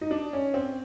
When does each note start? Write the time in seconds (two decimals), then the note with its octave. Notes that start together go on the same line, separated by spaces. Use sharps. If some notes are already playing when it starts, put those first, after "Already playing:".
0.01 D#4
0.11 D4
0.33 C#4
0.54 C4